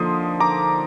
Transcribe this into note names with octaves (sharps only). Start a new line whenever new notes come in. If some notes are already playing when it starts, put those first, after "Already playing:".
Already playing: D3 F3 A#3 D#4 C6 D#6
A#5 D6